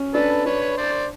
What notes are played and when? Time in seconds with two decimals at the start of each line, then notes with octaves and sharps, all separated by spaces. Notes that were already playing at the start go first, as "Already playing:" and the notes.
Already playing: C#4
0.14 D4 A4 B4
0.45 D4 B4 C#5
0.77 C5 D5